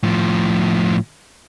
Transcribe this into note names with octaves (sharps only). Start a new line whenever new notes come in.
A2 F3